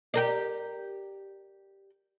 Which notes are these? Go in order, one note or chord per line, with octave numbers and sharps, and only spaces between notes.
G4 A#4 D5